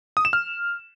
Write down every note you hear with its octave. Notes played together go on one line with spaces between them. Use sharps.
D#6
E7
F6